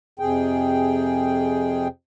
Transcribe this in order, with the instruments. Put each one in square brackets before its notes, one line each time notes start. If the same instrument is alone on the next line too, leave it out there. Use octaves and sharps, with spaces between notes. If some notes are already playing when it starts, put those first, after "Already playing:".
[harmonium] F2 C3 G#4 G5